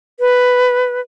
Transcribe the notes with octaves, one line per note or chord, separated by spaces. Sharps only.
B4